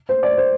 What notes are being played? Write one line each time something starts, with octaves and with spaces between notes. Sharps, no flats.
C5
D5
C5